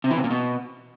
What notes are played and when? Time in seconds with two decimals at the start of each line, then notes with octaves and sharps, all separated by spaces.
0.04 C3
0.11 E3
0.17 C3
0.24 A#2
0.30 B2